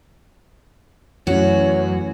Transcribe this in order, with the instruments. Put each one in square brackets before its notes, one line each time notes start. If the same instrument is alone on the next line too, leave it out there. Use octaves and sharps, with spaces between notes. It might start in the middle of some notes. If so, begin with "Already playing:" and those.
[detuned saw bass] F#2 [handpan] E3 A3 C#4 [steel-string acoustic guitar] F#4 [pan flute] C#5